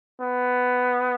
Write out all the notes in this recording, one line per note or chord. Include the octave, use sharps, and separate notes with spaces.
B3